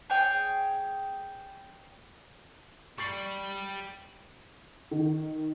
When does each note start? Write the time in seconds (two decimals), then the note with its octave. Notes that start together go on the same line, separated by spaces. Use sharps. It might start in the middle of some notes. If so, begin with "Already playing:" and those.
0.10 G#4 C#5 G5
2.98 G3 C#6 A6 C7
4.91 D#3